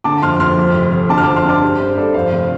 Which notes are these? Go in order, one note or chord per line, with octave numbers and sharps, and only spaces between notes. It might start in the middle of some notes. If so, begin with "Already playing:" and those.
D3 A5 D6
F2 C6 F6
F2 C6 F6
F2
F1
F1
D3 A5 D6
F6
F2 A5 D6
C6 F6
D4 A5 D6
G3 C5
G2 C5
G2 A4 D5
F2 C5 F5
F1